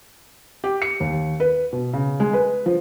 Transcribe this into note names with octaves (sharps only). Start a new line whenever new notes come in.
G4
C#7
D#2
B4
B2
C#3
G#3
B4
F3